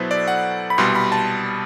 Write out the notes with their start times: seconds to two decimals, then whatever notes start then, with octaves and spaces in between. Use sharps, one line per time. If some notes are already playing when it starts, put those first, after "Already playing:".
Already playing: B2 F#3 B3 E4 A4 B4 C5
0.11 D5
0.28 F#5
0.70 B5
0.78 C2 B2 G3 C6
0.95 B5
1.12 A5